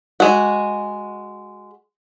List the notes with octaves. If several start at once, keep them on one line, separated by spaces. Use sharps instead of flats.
G#3 F#4